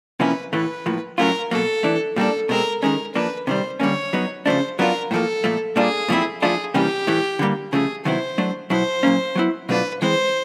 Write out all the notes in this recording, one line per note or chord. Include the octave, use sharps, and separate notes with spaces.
C3 F3 A#3 C#4 E4 B4
A2 E3 A3 B4
A2 F3 A#3
A2 F#3 A3 C#4 F4 A#4
B2 F#3 A#3 A4
E3 A3 D4
A#2 G3 A#3 D4 A4
B2 G#3 C4 A#4
D#3 G#3 C#4 A#4
F3 A#3 D4 B4
C3 D#3 G3 C5
D3 G3 A#3 C#4 C#5
F#3 B3 D#4
C#3 F3 A3 D4 C5
F#3 B3 D4 F4 A#4
A2 F3 A#3 A4
A#2 F3 A3
A#2 G3 A#3 D4 F4 G#4
A#2 F3 A3 C4 E4
F3 A3 D4 F4 G#4
C3 E3 G3 A#3 C#4 G4
A2 E3 A3
D3 G3 A#3
C#3 F3 A3 G#4
C3 D#3 F#3 B3 E4 C5
F#3 A3 D4
B2 F#3 B3 E4 C5
A#2 F#3 A#3 C#4
F#3 B3 E4
B2 F#3 A3 D4 F4 B4
E3 G#3 C4 C5